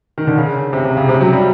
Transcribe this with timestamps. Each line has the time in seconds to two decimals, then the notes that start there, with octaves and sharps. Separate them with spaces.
0.18 D#3
0.27 D3
0.38 C#3
0.73 C3
0.85 C3
0.97 C#3
1.09 C3
1.20 F#3
1.33 G3